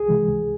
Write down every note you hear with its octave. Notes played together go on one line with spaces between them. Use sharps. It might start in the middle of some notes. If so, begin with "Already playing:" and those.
Already playing: C2 G#4
C3 E3 G#3
C#2